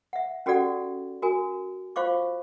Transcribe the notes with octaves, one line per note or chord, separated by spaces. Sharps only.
E5 F#5
C#4 F#4 G4 A4 D5 F#5
F#4 A#4 G#5
F4 C5 F5 C#6 D6